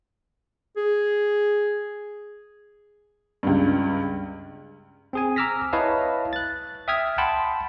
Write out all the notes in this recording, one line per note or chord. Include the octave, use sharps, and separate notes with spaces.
G#4
C#2 G2
C4 G#4 G#5
A#5 D6 E6 F6 A#6 B6
E4 B4 C#5 D#5 F5 A5
F#6 A6
E5 G5 D#6 F6 G#6 B6
F#5 G5 A5 B5 C6